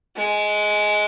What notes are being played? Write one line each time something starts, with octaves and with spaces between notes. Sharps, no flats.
G#3